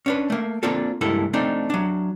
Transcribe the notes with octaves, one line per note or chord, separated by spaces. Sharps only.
C#4 D4 B4
A3 A#3
A#3 C4 D4 F4 A4
C#2 G2 A#3 E4 A4 A5
A3 C4 D4 D#4
F#3 D4